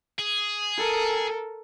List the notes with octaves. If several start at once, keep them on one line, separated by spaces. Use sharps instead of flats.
G#4
A4 A#4